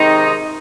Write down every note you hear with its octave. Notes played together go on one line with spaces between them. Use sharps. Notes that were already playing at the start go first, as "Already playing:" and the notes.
Already playing: C3 D#3 G#3 D#4